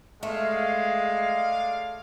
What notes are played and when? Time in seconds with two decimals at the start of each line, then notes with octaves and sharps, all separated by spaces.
0.23 G#3 A3 D5 F5